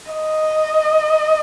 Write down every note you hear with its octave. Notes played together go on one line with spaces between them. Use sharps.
D#5